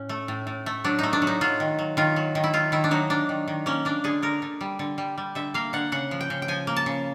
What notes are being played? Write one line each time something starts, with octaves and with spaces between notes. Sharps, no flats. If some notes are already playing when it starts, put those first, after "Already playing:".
Already playing: A2 C#4
A3
A2
A2
A3
F#3 D4
A3 D#4
D4
F#3
D#4
F#3 F4
D#3
F#3
D#3 F4
F#3
D#3
E4
D#3 F4
D#3 E4
D4
F#3 D#4
A#3 D4
D#3
D#3
A#3 C#4
A#3 D4
D3 G#4
D3 A#4
D3
G3
D3
G3
G3
D3 E5
A#3 F5
D3 F#5
C#3 F#5
F3
G5
C#3
G5
F3 G#5
A#3
A5
C#3